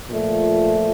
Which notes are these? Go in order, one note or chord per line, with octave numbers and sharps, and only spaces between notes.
A#2 F3 A3